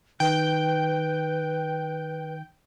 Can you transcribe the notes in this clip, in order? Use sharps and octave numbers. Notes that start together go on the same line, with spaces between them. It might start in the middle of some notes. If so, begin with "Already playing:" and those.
D#3 B4 G5